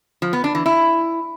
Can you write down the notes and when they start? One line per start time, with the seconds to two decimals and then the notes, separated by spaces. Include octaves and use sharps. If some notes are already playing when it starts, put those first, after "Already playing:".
0.22 F3
0.33 B3
0.44 D4
0.55 E3
0.66 E4